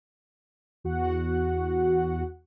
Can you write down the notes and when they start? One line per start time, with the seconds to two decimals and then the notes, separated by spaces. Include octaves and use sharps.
0.84 E2 F#4 F#5